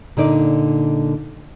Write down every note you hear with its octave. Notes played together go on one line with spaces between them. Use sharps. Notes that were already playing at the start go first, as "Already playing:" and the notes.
A#2 D3 D#4 D5